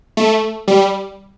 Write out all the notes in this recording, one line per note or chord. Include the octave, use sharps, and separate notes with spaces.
A3
G3